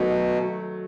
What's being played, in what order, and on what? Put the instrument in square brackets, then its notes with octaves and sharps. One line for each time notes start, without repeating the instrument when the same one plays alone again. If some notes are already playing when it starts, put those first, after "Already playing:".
Already playing: [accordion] B2 [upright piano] D#3 F#3 A3